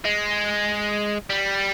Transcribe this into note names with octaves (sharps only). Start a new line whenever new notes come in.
G#3
G3